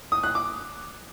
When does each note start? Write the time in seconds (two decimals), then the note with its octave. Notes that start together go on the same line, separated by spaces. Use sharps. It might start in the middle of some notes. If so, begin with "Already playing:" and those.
0.12 D#6
0.23 F#6
0.35 D6